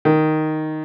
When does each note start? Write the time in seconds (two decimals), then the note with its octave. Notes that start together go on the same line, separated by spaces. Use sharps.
0.05 D#3